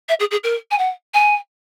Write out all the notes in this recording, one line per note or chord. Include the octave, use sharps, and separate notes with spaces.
E5
G#4
G#4
A#4
G#5
F#5
G#5